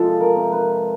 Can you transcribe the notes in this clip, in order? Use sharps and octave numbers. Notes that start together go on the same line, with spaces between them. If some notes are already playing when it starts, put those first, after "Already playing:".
Already playing: C3 F3 G#3 F4 A4
A#4
C3
B4